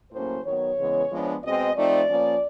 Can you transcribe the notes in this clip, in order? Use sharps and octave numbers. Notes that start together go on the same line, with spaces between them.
A2 F#3 A#3 C#4 C5
D#3 F#3 B3 C#5
C#3 E3 G#3 B3
F3 G#3 B3 D4
B2 G#3 C4 D#5
F3 A3 C4 D#4 D5
F3 A#3 C#4